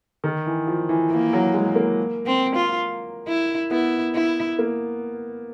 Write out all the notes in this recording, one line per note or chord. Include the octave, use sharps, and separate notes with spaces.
D#3
E3
F3
E3
E3 A#3
F#3
G#3
A#3
C4
F4
E4
B3 E4
E4
A#3